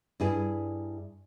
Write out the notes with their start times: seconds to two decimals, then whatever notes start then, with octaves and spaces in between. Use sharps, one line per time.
0.20 G2 E4 G#4